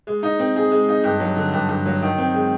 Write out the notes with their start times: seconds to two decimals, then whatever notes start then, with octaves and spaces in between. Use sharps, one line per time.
0.07 G#3
0.23 D#4
0.39 C4
0.56 G#4
0.71 G#3
0.89 D#4
1.04 G2
1.20 F#3
1.36 D3
1.53 G2
1.69 G2
1.86 F#3
2.02 D#3
2.18 C4
2.34 G#3